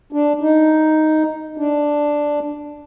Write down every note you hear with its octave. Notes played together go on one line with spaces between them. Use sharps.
D4
D#4
D4